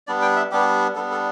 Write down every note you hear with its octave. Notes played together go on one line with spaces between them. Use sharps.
G3 B3 D4 D5
G5
E5
G3 B3 D4 G4
G3 B3 D4 A4
A4